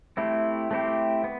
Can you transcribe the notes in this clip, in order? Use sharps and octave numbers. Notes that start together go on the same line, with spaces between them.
A3 C4 E4 G4
A3 C4 E4 G4
B3